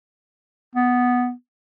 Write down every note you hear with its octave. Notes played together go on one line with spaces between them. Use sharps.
B3